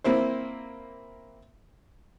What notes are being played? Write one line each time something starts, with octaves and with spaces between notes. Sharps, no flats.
A#3 C4 E4 C5